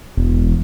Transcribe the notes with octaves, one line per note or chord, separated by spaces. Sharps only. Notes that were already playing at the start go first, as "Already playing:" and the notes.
E1